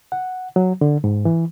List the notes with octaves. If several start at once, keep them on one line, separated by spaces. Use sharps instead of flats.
F#5
F#3
D3
G#2
E3